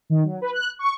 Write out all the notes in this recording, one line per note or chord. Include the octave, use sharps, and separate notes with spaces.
D#3
F#3
B4
F#6
C#6